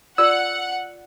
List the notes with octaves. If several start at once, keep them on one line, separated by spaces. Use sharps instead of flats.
F4 A#4 D5 F#5 E6